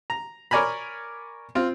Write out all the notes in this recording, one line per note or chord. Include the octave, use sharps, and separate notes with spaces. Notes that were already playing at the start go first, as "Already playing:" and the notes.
A#5
A#4 C#5 D5 G#5 A#5 B5
C4 F4